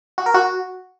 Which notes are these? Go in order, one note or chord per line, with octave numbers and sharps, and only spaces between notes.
F#4
A#4
F#4